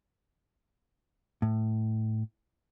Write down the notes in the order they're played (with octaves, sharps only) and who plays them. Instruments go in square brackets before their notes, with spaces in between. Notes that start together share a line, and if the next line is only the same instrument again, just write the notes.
[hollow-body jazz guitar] A2